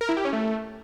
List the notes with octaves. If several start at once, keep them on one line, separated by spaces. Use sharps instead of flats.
A#4
E4
G4
C#4
A3